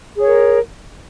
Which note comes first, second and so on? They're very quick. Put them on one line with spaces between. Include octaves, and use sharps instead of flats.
G#4 C#5 A#4